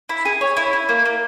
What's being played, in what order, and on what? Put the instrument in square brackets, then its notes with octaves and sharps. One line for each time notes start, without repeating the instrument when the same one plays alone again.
[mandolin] E4
G#4
C#5
E4
E4
A#3
A#3